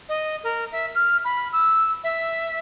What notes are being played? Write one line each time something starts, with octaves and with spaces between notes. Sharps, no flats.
D#5
A#4
E5
F6
B5
E6
E5